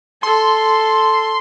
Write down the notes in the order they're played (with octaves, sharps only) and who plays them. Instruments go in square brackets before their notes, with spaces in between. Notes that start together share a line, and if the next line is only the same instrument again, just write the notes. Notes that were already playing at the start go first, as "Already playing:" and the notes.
[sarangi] A4 [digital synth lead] C6